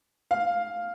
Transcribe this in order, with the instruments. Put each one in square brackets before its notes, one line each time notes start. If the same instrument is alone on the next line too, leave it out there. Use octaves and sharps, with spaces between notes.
[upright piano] F5